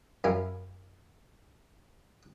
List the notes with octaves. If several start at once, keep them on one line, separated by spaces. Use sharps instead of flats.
F#2 E4 A#4 F5 G#5